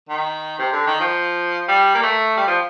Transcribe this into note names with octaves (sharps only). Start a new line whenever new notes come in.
D#3
C3
D3
D#3
F3
G3
A#3
A3
G3
F3